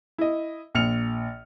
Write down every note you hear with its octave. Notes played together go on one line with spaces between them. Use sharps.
E4 D#5
A#1 F6 C#7 F7